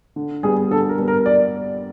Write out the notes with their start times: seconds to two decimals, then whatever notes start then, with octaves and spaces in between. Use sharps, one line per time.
0.16 D3
0.43 G3 B3 G#4
0.71 D3 A4
0.89 A#4
0.98 G3 B3
1.08 A#4
1.26 D5